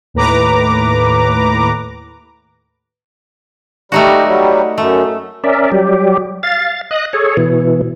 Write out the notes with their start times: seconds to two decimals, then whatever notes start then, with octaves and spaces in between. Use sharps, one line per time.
0.14 D#2 A2 B4 A#5 D6
3.92 G3 A3 D#4 F#4
4.27 F#3 G3
4.78 F#2 A3
5.44 C#4 A#4 D5 E5
5.72 F#3 G3 G4
6.43 F5 A6
6.91 D#5 D#6 F#6
7.13 G#4 A4 C#5
7.37 B2 E3